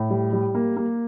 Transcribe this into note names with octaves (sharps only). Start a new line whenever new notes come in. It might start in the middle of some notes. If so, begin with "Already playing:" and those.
Already playing: A2
G3
G3
A#3
A#3